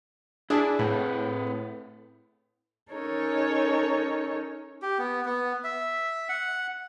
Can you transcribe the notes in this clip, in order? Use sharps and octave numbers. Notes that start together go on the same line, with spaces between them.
D4 E4 G#4
A2 C4 B4
C#4 D#4 A4 A#4 C#5
G4
B3
B3
E5
F#5